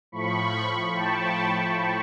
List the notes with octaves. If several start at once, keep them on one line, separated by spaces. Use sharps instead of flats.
A2 F3 B5 C#6
G5 A5